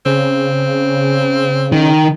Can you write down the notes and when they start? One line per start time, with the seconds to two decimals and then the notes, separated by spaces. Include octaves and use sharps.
0.06 C#3 C4
1.72 D#3